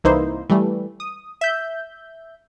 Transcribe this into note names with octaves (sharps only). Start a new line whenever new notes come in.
C2 E3 A#3 D#4 E4 C5
E3 G3 A3
D#6
E5 G6